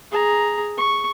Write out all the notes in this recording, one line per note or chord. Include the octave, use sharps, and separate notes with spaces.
G#4 A#5
C#6